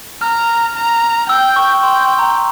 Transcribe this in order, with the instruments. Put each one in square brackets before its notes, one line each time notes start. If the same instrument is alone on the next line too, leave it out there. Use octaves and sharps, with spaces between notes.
[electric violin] A#5 [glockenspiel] F6
[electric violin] A#5
[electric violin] G5 [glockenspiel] E6
[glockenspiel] C#6
[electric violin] G5 [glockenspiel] C6
[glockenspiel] C6
A#5